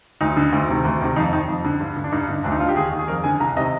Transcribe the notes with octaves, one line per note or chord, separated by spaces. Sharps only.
D2 D#4
D3
D2
C3 D#3
D2
C3 D#3
F2 D#4
D#3 D#4
F2
D3
G2
D3
D4
G2 D#4
D3
D2 D4
D#4
D3 F4
G4
D#2 G#4
D#3
G#4
F2 A#4
D3 G#5
C2 A#5
C3 D#3 D#5